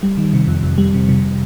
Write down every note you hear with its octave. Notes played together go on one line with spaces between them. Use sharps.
G3
D#3
C3
F2
F2
G3
C3
C3